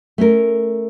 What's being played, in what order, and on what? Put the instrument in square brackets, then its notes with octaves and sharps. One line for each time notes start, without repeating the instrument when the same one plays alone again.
[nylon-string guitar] A3 C#4 A#4